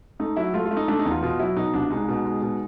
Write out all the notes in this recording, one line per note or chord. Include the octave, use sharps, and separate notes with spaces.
A3 D#4
F#3 E4
A3 F4
F4
A3
D#4
A3 D4
D#4
E2
F4
B2 F4
F#3 E4
B2 D#4
C2 D4
G#3 D#4
B2
G#3
B2